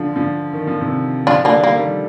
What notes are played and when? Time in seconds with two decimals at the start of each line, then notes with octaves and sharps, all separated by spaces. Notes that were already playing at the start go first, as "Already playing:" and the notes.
Already playing: D3 F3 D4 F4
0.16 D3 F3
0.53 D#3
0.67 F3
0.81 C3 D#3
1.27 D3 F3 D4 F4
1.45 A3 A#3 D4
1.51 D#3 G3
1.64 A#3
1.76 D#3 G3